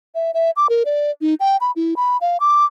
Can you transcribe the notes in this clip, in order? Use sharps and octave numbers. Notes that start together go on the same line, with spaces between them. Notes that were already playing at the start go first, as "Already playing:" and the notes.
E5
E5
D6
A#4
D5
D#4
G5
B5
E4
B5
F5
D6